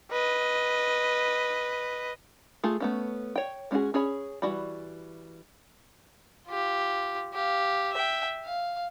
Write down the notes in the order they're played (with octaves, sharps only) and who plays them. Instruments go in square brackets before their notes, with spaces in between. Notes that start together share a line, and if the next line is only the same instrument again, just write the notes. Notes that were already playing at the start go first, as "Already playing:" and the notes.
[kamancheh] B4 D#5
[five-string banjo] A3 F4 G#4 A5
A3 B3 C#4
C#5 G5
G#3 C#4 F4 F#4 G#4
C#4 G#4 C#5 B5
E3 G3 F#4 D5 B5
[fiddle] F4 G4
G4 F5
E5 G5
F5